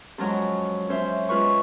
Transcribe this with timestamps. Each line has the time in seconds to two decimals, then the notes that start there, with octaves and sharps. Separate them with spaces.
0.18 F#2 F3 F#3 G#3
0.89 C#4 C5 E5
1.29 G#3 F4 B4 C#6